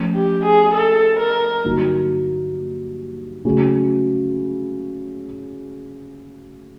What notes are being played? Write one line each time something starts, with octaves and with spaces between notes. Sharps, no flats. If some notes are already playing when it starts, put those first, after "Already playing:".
Already playing: F3 A3 C#4
G4
G#4
A4
A#4
G2 D3 F#3 A#3 D#4
C#3 F#3 A3 C#4 F#4